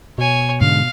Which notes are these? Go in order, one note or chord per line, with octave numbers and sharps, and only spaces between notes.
B2 C#5 G#5
G#2 D3 G#3 F5